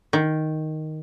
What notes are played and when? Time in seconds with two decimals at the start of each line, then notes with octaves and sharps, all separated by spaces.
0.13 D#3